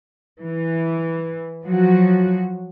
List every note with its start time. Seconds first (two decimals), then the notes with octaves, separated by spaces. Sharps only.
0.43 E3
1.64 F3 F#3 F#4